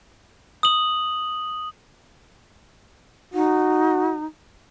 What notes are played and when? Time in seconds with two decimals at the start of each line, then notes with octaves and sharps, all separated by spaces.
0.63 D#6 F#7
3.34 D#4 F#4